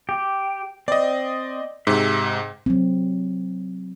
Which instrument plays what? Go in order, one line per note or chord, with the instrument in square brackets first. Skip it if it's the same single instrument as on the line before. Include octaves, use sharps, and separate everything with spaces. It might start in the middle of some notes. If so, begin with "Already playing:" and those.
[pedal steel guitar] G4
[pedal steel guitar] C4 [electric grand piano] D5 D#5
[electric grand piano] G#2 C3 [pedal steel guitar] E5
[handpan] F#3 C4